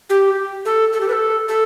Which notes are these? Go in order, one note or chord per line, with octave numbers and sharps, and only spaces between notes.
G4
A4
A4
G4
B4
A4
A4